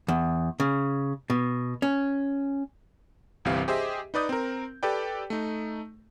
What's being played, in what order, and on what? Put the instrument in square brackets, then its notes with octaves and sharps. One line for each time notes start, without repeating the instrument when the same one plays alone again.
[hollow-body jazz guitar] E2
C#3
B2
C#4
[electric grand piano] G1 C2 E3 C4 G4 F5
G4 G#4 C5 D#5 E5
D#4 B4 D5 D#6 G6
C4 A#4
G4 A4 B4 D5 G5
A3 D#4